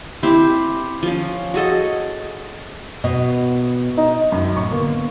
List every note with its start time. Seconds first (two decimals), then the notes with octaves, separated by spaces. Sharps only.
0.23 C4 E4 G4 C5
1.03 F3 C#4
1.54 F#4 G#4 A4 D#5
3.04 B2 D#5
3.97 D#4
4.32 F#2
4.56 A2 C#6
4.71 D3 A#3 B3